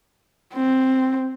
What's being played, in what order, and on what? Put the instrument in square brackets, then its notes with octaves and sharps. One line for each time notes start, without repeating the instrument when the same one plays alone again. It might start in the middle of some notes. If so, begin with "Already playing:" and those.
[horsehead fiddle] C4